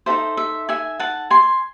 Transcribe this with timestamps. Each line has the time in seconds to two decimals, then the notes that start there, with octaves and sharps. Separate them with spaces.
0.06 D#4 F#4 A4 C5 E5
0.37 E5
0.69 E5 G#5
1.00 F#5 A5
1.30 G#5 C6